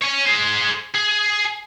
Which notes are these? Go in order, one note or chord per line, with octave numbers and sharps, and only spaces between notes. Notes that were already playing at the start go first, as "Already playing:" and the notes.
C#5 G#5
G#4 C5
G#4